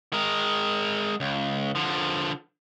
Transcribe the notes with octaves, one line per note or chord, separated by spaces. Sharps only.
G#3 A#4
C#2
D3 F3